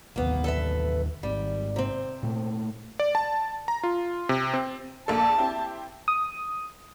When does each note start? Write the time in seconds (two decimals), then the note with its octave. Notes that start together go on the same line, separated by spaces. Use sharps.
0.16 A1 D#2 A#3 B3
0.44 A4 B4 E5
1.23 G#1 G#2 G3
1.76 C3 C4
2.23 A#2 A3
2.99 D5
3.15 A5
3.68 A#5
3.83 F4
4.29 C3
4.53 C4
5.08 A#1 A#3 A4 A5
5.38 C4 E4 G4
6.08 D#6